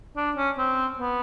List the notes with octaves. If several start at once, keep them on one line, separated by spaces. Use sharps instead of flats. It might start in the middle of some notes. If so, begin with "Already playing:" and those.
D4
C#4
C4
B3